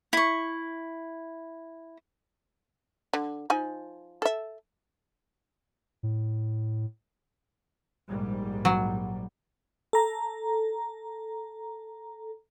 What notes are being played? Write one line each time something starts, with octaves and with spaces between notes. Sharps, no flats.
E4 C#6
D3
F3 D#4 G#5
A4 E5
A2
A#1 G#2 G3
F#3
A4 A#5